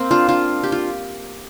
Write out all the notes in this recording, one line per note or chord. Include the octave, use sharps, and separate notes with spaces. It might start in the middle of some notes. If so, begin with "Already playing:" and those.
Already playing: A#3 C4
D4 F4
D4 F4
G4
F4